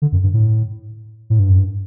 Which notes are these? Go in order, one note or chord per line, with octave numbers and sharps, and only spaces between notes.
D3
F#2
G2
A2
A2
G2
F#2
G2